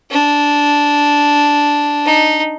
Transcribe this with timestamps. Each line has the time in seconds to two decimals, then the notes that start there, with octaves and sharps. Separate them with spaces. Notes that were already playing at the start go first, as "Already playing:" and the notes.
0.11 D4
2.06 D#4